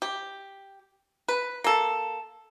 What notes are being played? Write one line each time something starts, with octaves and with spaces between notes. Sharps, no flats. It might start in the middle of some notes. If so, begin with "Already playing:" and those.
G4
B4
A#3 A4